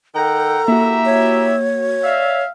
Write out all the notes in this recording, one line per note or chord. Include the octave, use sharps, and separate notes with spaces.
D#3 A4 F#5 G5 A#5
A#3 E4 F#4 G4 E5
C#5
D5 E5 F5